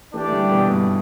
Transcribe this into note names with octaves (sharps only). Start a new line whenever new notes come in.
E3 A3 D4 G4 D5 G5
A3
D3 G3
G3
B2 E3
G2 B2